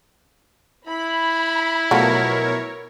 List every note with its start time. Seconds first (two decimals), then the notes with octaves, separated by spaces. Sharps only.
0.87 E4 B5
1.91 B2 F3 F#3 A3 A#4 C#5